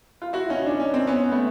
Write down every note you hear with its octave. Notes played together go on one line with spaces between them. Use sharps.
F4
E4 F#4
C#4 D#4
D4
C#4
C4
B3 C#4
A3 B3